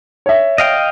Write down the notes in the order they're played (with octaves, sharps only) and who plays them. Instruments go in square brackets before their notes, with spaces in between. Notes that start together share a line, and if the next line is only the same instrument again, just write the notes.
[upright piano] C#5 E5
[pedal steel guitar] D#5 F5 G5